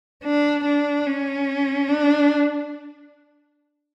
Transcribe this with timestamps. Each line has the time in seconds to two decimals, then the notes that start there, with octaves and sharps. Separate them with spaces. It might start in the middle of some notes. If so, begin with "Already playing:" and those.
0.24 D4
0.65 D4
1.07 C#4
1.89 D4